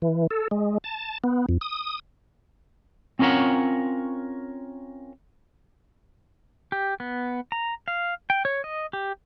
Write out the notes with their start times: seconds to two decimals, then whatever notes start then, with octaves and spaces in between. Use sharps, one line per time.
0.02 E3
0.31 A4
0.51 G#3
0.84 A5
1.24 B3
1.49 F2
1.61 D#6
3.19 C4 C#4 F4 A#4 C#5 F#5
6.72 G4
7.00 B3
7.52 A#5
7.88 F5
8.30 G5
8.45 C#5
8.64 D#5
8.93 G4